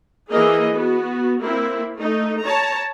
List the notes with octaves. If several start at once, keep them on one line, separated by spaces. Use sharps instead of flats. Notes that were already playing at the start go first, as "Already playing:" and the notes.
E3 A#3 G#4 D#5
B3 F#4
A#3 C4 E4
A3 D#4
C#5 A5 A#5